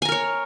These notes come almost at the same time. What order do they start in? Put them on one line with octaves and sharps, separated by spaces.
G#5 A#5 A#4 C#5